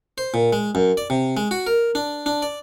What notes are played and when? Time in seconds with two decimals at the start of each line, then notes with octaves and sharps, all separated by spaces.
0.18 C5
0.34 A#2
0.53 G#3
0.75 F#2
0.97 D5
1.10 C3
1.37 G#3
1.51 F#4
1.67 A#4
1.95 D4
2.26 D4
2.42 D5